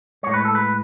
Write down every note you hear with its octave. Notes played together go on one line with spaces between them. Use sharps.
A2 G#3 C#5
B4
A4
B4